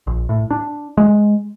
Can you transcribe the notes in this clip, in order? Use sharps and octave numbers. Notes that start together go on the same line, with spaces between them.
A#1
A2
D4
G#3